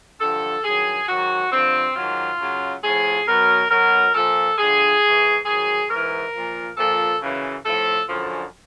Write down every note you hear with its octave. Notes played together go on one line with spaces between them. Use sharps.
G2 D3 F3 A4
G2 D#3 F#3 G#4
G#2 D#3 F#3 F#4
G2 D3 F3 C4
G#2 D#3 F#3 F4
F#2 C#3 F#3
A2 F3 G#4
B2 F#3 A#4
B2 F#3 A#4
A#2 F3 A4
G2 D3 F3 G#4
G#2 E3
G#2 D#3 F#3 G#4
G#2 A#4
E3
A#2 F3
A#2 F3 A4
F#2 C#3 E3
A2 F3 A4
F#2 D3 F3